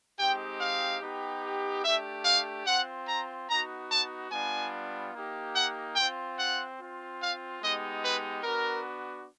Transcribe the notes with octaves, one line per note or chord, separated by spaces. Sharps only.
G#3 C4 D#4 G4 G5
F5
B3 D#4 G4
A3 D4 G4 E5
F5
C4 F4 F#5
A#5
B3 D#4 F#4 A#5
A5
G3 B3 D4 F4 G#5
A#3 D#4 G4
F#5
C4 F4 G5
F#5
C4 F4
F5
G#3 B3 D#4 G4 D#5
B4
B3 D4 F#4 A#4